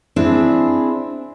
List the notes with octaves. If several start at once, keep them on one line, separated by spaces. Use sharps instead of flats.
C4 D4 E4 G#4